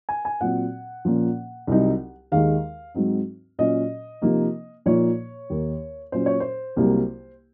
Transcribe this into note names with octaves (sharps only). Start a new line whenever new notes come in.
G#5
G#5
A#2 F#3 C4 F#5
A#2 F3 A#3 C#4
C2 C3 F#3 C4 D#4
D#2 D#3 G#3 D#4 F5
G#2 F#3 C4 D#4
A#2 F#3 C#4 D#5
C3 F3 A#3 D#4
A#2 F3 A#3 D#4 C#5
D#2 D#3 A#3
A#2 F#3 C#4 C5
C#5
C5
C2 C3 F#3 A#3